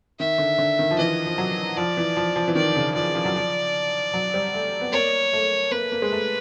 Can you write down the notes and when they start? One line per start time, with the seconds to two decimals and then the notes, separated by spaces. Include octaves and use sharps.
0.20 D#3 E5
0.38 D3
0.58 D3
0.79 D#3
0.91 F3
0.98 E3 D#5
1.26 F3
1.38 F#3
1.77 F3 D5
1.97 E3
2.17 F3
2.36 F3
2.48 E3
2.55 D#3 D5
2.76 C#3
2.95 F3 D5
3.15 F3
3.25 F#3
3.36 F3
4.14 F#3
4.34 G3
4.54 A3
4.81 B3
4.93 A#3 C#5
5.33 A3
5.71 A#3 B4
5.92 A#3
6.02 G#3
6.12 A3